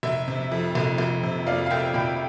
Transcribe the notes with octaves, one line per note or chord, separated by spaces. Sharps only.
F1 E5
C3
F2
F1
F1
C3
F2 D5 F5
F5
F1 E5 G5
F1 G5 B5